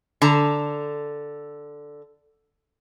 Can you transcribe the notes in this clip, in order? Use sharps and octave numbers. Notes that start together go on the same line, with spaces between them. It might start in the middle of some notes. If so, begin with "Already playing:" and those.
D3 A5 A#5